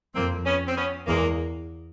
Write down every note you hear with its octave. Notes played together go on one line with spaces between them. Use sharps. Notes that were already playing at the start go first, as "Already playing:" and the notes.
F2 A#3 C4
B3 C#4
C4
B3 C#4
E2 G#3 A#3